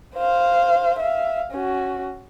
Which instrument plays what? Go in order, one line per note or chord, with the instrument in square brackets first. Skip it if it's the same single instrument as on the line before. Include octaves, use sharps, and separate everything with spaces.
[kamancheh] C5 F5
E5 F5
C#4 F#4